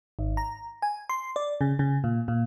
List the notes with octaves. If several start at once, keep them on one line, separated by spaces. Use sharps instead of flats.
G#1
A#5
G#5
C6
D5
C#3
C#3
A#2
A#2